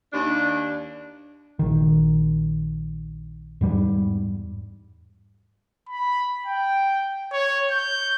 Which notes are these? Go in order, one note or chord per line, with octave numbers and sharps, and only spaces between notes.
D#2 D4
A#1 D#3
E2 G#2 G3
B5
G5
C#5
G6